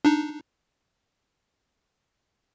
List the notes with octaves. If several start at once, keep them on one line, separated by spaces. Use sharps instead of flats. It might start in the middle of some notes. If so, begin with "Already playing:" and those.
D4 D#4